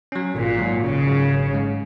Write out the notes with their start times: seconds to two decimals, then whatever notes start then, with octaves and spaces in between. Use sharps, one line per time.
0.12 F#3 C#4
0.35 G#1 A#2
0.58 G#2 F#3
0.82 G#1 C#3
1.07 G#2 F#3
1.30 G#1
1.53 G#2 G#3